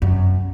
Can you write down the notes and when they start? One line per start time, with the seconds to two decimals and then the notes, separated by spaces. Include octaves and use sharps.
0.02 F#2